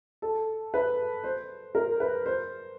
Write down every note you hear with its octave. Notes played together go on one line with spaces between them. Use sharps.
A4
B4
C5
A#4
B4
C5